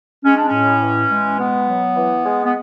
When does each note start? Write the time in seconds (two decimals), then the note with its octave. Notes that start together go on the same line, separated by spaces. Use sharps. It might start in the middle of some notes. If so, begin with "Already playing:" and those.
0.24 G#3 C#4
0.36 D4
0.47 C#4
0.52 A2
0.82 E3
1.09 G#3
1.38 B2 B3
1.66 F#3
1.96 E3
2.25 G#3
2.44 B3